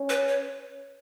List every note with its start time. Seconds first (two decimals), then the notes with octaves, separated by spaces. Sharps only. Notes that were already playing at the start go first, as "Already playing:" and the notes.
Already playing: C#4
0.09 B4
0.28 C#5